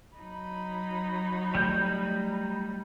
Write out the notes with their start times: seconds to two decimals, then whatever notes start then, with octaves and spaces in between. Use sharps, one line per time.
0.17 F#3 D#4 B5
1.55 G3 A3 G6